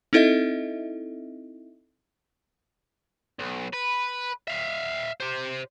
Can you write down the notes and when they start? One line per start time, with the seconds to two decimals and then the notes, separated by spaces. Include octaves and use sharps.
0.13 C4 D#4 E4 A4 D#5 E5
3.39 B1
3.74 B4
4.48 E5 F5
5.20 G4 C5